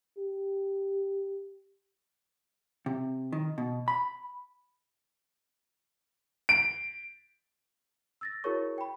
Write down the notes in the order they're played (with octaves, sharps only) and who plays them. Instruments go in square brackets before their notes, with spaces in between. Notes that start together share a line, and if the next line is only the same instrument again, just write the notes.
[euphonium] G4
[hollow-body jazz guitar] C3
D#3
B2
B5
[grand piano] D7
[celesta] E6 A6 A#6
E4 F#4 G#4 A#4 C#5 C#6
G5 B5